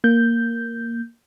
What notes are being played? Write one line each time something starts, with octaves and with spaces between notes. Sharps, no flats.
A#3 G6